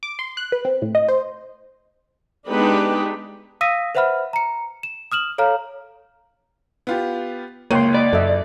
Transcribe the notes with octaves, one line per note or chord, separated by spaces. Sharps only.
D6
C6
F#6
B4
C4
A2
D#5
C5
G#3 B3 D4 D#4 G4 B4
F5 D#6 E6 A#6 B6 D#7
B4 C5 E5 F#5 B5 F6
A#5 C#7
E7
D#6 F6 E7 F#7
A4 C#5 F5 A#5 F6
B3 F4 G4
F#1 C#2 A#3 C#5 G5 C6 D#7
D5 D#5 B5
F#2 A4 D#5 E5